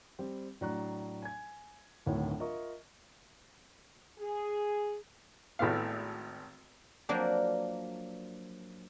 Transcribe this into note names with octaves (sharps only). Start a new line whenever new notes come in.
G3 C4
A2 F#3 D4 A#5 C#6 F#6
G#5 G#6
D1 G1 D2 A2 D#3 C#5
F4 A#4 D#5 E5 C#6
G#4
G#1 A2 A3 B3 F5
F3 F#3 A#3 D4